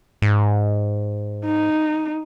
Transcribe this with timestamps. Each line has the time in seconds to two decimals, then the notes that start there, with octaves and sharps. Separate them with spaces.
0.22 G#2
1.46 D#4